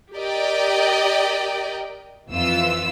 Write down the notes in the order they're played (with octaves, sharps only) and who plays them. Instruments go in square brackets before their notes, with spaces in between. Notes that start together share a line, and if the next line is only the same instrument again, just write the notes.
[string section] G4 A#4 D5 D#5 G5
F2 E3 F4 E6